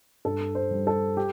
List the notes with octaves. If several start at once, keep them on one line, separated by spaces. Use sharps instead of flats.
G2 A4
C5
G3
A4
G4